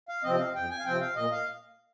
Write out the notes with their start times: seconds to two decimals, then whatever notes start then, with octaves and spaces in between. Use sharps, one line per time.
0.09 F5
0.24 C3 F3 C4 D#5
0.35 D#5
0.39 F5
0.55 F2 G5
0.70 G#5
0.79 F5
0.85 C3 F3 C4 G5
1.00 F5
1.16 A#2 D#5
1.31 F5